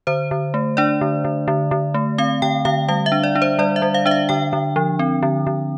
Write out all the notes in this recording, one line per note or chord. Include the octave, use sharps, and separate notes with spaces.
D3 C5
D3
A3
D4 D5
D3
D3
D3
D3
A3
C4 F5
D3 G5
D3 F5
G3 F5
E5
D4
D5
D4
C5
G3 D5
E5
G3
F5
D4 E5
F5
D3 G5
D3
F3
C4
D3
D3